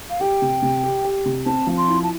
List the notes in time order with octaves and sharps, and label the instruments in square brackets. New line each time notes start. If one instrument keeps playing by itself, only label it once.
[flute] F5
[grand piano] G4 [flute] G5
[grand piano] C3
C3
G4
G4
C3
[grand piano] C4 [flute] A5
[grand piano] F3
[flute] C6
[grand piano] E4
[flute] A5